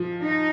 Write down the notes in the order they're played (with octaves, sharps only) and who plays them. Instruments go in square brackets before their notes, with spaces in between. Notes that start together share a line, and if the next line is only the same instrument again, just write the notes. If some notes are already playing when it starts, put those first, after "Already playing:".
Already playing: [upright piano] F3
[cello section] D#4